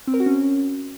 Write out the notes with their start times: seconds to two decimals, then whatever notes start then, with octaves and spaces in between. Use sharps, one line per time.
0.07 C4
0.14 A#4
0.20 F#4
0.26 C#4